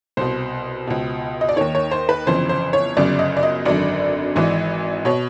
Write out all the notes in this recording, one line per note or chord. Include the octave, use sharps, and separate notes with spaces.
C2 B2 C5
C#2 B2
D#5
D5
D#2 D#3 C#5
C#5
C5
B4
G1 F2 C#3 E3 C5
C5
C#5
G1 F#2 C#3 D5
D#5
D5
D#5
G#1 F#2 D3 D5
G#1 G#2 E3
B2 C#5